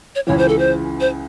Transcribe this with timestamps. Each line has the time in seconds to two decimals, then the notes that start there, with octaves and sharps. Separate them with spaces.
0.15 C#5
0.27 C#2 C#3 E3 C#5
0.38 C5
0.48 A4
0.59 C5
1.00 C5